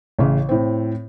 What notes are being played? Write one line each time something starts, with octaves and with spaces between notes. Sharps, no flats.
A1 C#3
A2 C4